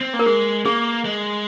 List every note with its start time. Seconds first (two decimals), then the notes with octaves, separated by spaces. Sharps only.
0.01 C4
0.13 A#3
0.19 A#4
0.26 G#3 G#4
0.65 A#3 G#4
1.05 G#3